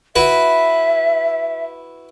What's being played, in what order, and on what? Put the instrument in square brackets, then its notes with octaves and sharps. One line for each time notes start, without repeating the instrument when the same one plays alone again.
[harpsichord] E4 F#4 B4 [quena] E5